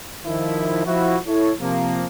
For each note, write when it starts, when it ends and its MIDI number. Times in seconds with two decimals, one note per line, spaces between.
0.24 0.84 51
0.24 0.84 53
0.24 0.84 64
0.86 1.17 53
0.86 1.17 64
0.86 1.17 66
1.27 1.51 64
1.27 1.51 69
1.27 1.51 73
1.60 2.07 48
1.60 2.07 53
1.60 2.07 58